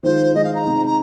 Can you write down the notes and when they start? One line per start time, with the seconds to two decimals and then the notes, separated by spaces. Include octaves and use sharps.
0.03 D#3 G#3 F4 C5
0.34 D#3 G#3 F4 D#5
0.44 F5
0.55 A#5
0.65 C3 G#3 D#4
0.86 A#5